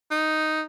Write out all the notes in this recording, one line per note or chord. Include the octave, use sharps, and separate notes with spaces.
D#4